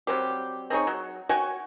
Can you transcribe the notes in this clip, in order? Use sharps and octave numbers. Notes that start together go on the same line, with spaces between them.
F#3 G3 C4 G4
C4 D#4 G#4 C#5
F#3
F#4 C#5 G5 G#5